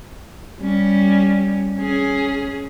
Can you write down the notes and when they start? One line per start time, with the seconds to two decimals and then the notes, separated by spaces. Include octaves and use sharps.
0.61 G3 C#4
1.78 C#4 G#4